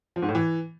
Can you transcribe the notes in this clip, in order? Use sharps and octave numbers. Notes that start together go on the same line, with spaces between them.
F3
G#2
A2
E3